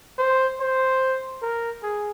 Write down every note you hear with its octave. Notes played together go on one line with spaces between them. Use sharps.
C5
C5
A#4
G#4